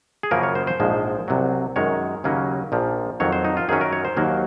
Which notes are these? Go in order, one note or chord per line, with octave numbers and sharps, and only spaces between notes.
G#4
F#2 C#3 F3 A#3 C#4 A#4
C#5
C5
C5
A#1 G#2 F3 G#3
C2 C3 F#3
F#2 D#3 G#3 C#5
D#2 C#3 F#3 A#3 C#4
A#1 A#2 F3
F2 D#3 F#3 C#5
C5
D#4
F4
F#2 D#3 F#3 C#4 G#4
A#4
C#5
C5
D#2 D#3 F#3 A#3